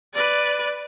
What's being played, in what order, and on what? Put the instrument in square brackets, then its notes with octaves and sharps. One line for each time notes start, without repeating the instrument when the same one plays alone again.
[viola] B4 D5